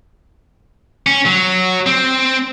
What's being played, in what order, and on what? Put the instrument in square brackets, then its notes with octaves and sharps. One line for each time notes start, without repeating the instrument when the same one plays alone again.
[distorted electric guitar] C#4
F#3
C4